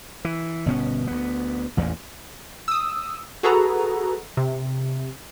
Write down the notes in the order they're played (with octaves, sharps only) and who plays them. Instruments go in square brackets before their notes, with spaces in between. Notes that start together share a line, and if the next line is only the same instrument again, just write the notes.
[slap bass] E3
G1 B2 B3 C#4
D2 B3
A1 E2 A#2
[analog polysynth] D#6 E6
F#4 G#4 A4 B4 A#5
C3